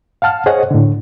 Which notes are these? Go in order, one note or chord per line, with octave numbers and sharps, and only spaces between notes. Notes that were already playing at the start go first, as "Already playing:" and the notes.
F5 F#5 A5 F6
G#4 C5 C#5 D#5 F#5
A2 D3